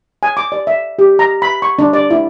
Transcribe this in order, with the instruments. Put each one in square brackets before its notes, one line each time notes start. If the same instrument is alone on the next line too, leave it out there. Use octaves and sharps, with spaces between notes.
[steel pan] G#5
D6
D5
E5
G4
A#5
B5
C#6
D4
D5
E4